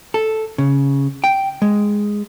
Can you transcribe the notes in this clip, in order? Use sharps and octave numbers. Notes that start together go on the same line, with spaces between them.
A4
C#3
G5
G#3